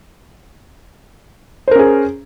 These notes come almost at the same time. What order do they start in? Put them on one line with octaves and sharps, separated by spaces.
C5 A#4 C#4 G#4